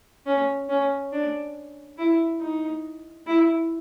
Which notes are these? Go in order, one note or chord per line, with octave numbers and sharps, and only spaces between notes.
C#4
C#4
D4
E4
D#4
E4